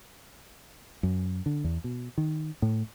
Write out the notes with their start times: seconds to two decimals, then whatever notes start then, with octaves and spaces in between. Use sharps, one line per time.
1.03 F#2
1.46 D3
1.64 E2
1.84 B2
2.18 D#3
2.62 A2